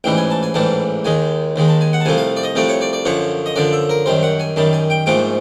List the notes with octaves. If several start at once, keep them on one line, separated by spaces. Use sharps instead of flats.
A1 G#2 E3 G3 G5
G#5
A5
G#5
A1 G#2 E3 G3 A5
D#2 D#3 G#3 G#5
D#2 D#3 G#3
A5
G#5
F#5
A5
C2 C3 F3 A3 G#5
F5
D5
D#5
C2 C3 F3 A3 D5
C#5
D5
D5
F#2 D3 F3 C#5
D#5
F#2 D3 F3 D5
E5
A#4
F#2 D#3 G3 C5
F#5
G#5
F#2 D#3 G3 A5
G#5
G5
A#1 G#2 F3 A3 G5